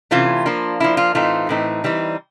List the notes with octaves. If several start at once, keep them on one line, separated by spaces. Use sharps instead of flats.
C3 E3 A3 C#4 F4
F3 A#3 D4
F3 A#3 D4 E4
F4
A2 E3 A3 C4 D#4 F4
A2 E3 A3 C4 D#4
E3 G3 C4 D#4